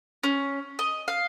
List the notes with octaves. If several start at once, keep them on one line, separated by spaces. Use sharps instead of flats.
C#4
D#5
F5